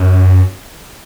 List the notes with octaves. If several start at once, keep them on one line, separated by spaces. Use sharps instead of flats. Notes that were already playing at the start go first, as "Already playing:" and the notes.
Already playing: F#2